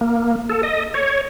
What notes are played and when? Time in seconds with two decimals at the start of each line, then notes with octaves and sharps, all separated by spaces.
0.01 A#3
0.49 A4
0.63 D#5
0.94 C#5